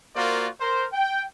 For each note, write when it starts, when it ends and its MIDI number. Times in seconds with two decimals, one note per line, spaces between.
0.15 0.48 58
0.15 0.48 65
0.15 0.48 66
0.15 0.48 70
0.15 0.48 72
0.15 0.48 74
0.60 0.85 70
0.60 0.85 72
0.93 1.24 79